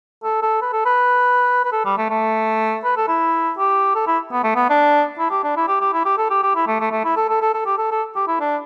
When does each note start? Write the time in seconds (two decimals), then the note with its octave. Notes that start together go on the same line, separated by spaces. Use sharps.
0.24 A4
0.42 A4
0.62 B4
0.73 A4
0.85 B4
1.65 B4
1.72 A4
1.85 G3
1.98 A3
2.10 A3
2.84 B4
2.97 A4
3.08 E4
3.58 G4
3.95 A4
4.07 E4
4.32 B3
4.44 A3
4.56 B3
4.70 D4
5.19 E4
5.31 G4
5.44 D4
5.56 E4
5.68 G4
5.81 G4
5.93 E4
6.05 G4
6.17 A4
6.30 G4
6.43 G4
6.55 E4
6.67 A3
6.80 A3
6.92 A3
7.04 E4
7.16 A4
7.29 A4
7.42 A4
7.54 A4
7.66 G4
7.78 A4
7.91 A4
8.16 G4
8.28 E4
8.40 D4